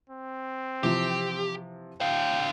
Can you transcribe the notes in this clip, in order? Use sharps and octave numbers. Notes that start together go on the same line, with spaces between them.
C4
C3 E3 F3 G4
D3 F5 G5